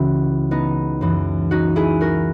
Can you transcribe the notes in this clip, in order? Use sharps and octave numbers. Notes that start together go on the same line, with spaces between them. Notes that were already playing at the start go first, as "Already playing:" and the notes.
Already playing: C#2 C#3 E3 E4 F#4
B3 D#4
F#2 E3
D#4 F#4
E4 G#4
F#4 A#4